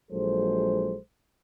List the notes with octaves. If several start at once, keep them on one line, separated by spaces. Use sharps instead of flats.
A#1 F#3 G#3 A4 C5